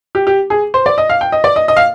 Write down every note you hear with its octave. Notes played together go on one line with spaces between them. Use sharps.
G4
G4
G#4
C5
D5
D#5
F5
G5
D#5
D5
D#5
D#5
F5